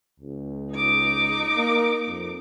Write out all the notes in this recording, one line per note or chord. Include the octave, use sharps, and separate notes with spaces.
C#2
D#4 D6
A#3
F2